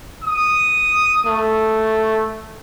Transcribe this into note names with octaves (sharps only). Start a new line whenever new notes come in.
D#6
A3